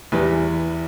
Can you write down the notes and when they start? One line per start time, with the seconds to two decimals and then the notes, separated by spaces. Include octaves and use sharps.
0.12 E2 E3 G3 B4